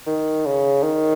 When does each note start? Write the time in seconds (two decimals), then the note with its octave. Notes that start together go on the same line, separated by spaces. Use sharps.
0.07 D#3
0.46 C#3
0.83 D#3